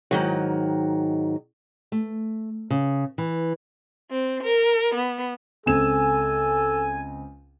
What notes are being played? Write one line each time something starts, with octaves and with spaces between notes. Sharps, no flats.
G#2 D#3 F#3
A3
C#3
E3
C4
A#4
B3
C#2 C4 A4 G#5 E7